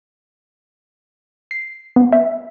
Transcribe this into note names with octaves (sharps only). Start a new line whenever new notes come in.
C7
B3
E5